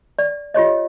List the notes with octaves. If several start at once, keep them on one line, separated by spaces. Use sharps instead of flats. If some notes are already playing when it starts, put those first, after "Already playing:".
D5
F4 G4 C#5 D#5